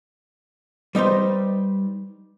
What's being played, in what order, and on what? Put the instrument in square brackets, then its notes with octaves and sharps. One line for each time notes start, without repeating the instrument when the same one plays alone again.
[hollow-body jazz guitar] G3 D#4 B4 C5